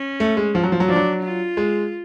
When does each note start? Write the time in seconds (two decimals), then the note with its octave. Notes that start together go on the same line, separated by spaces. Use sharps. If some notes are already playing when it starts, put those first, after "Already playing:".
Already playing: C#4
0.20 A3
0.37 G#3
0.55 F3
0.63 F#3
0.72 F3
0.80 F#3
0.89 F3 D4
0.96 F#3
1.23 F4
1.57 G#3